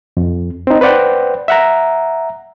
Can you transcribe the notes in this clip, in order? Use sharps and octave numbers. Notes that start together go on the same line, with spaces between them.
F2
C4 D#4
B4 C5 D5 F#5 G5
E5 F#5 A#5